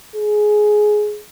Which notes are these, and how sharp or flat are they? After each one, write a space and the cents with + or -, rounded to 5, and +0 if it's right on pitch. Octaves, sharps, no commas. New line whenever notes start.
G#4 +15